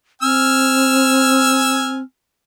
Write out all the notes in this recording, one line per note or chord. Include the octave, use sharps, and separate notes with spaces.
C4 G#5 E6 F6